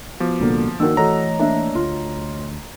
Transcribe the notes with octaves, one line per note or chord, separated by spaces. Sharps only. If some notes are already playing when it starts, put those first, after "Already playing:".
F3 B3 F#4 D6
C2 A#2 D3 G3 A#3
D#3 A#3 D4 F#4 A#4 E6
E3 A3 F#4 A4 C#5 D#5 A#5
A#3 D4 E5
D2 F4